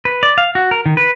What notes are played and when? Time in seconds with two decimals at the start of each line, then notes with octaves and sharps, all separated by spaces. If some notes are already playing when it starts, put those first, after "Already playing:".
0.05 B4
0.23 D5
0.38 F5
0.55 F#4
0.71 A#4
0.86 D#3
0.97 B4